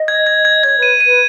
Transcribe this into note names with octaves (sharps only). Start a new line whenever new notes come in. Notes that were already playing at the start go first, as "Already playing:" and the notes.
Already playing: D#5
G#6
G#6
G#6
C#5 G#6
B4 D#7
D#7
B4